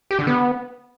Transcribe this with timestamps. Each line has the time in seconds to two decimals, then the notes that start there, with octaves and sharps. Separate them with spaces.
0.11 G4
0.19 D3
0.27 B3